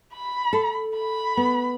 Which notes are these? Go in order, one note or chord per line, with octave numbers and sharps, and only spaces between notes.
B5
A4
B5
B3